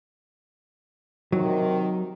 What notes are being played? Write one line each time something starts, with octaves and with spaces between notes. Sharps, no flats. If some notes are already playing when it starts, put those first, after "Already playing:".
C3 D#3 F#3